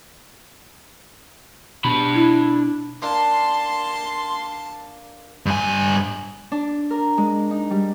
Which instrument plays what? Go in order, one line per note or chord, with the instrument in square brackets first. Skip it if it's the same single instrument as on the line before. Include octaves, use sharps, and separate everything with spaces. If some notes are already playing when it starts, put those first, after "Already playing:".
[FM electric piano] B2 [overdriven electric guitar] D4 B5
[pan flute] E4
[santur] A#3 D4 A#4 [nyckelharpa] A5 [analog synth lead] C6
[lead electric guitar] G2 G#5
[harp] D4
A#4
G#3
D#4
G3